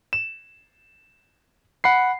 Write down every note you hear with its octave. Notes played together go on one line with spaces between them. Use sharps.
E7
F#5 B5 C7